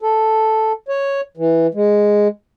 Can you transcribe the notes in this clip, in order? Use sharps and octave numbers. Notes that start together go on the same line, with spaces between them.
A4
C#5
E3
G#3